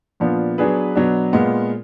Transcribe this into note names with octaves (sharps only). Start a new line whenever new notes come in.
A#2 F3 B3 D4 F4
F#3 B3 D4 G#4 B4
B2 F#3 B3 D4
A#2 G#3 B3 F4